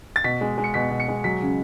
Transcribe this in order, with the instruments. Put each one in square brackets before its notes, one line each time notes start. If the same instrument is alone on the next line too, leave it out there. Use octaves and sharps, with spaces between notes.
[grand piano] A6
B2 B6
G#3
G#3
C#7
B2 B6
B2
C#7
G#3
F#3 B6
C#3